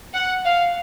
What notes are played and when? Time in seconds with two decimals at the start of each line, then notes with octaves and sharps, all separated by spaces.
0.14 F#5
0.45 F5